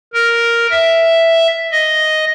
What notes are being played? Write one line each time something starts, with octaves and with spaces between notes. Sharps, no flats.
A#4
E5
D#5